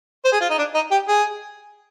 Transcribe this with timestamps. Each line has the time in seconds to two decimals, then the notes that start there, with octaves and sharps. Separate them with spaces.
0.25 C5
0.32 G#4
0.41 F4
0.50 D#4
0.58 D4
0.75 D#4
0.91 G4
1.08 G#4